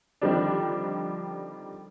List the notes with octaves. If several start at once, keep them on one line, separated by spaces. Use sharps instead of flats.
D3 D#3 F3 G3 C4 D4